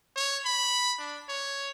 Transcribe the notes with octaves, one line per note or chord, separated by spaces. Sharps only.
C#5
B5
D4
C#5